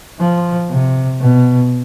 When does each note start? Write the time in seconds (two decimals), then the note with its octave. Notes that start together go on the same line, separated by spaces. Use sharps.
0.19 F3
0.70 C3
1.20 B2